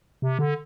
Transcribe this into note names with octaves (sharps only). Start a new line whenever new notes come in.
C3
D3